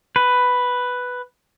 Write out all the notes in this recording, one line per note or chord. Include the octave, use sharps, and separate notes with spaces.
B4